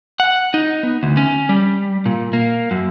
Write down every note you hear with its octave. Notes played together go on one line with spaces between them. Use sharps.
F#5
D#4
B3
D2
C#4
G3
A#2
A#3
F#2